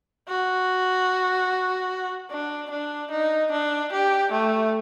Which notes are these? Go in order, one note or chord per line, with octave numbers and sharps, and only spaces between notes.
F#4
D4
D4
D#4
D4
G4
A3